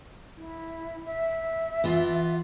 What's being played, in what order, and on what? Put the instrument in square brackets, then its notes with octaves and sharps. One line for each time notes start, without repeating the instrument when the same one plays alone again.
[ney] E4
E5
[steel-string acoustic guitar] E3 B3 F4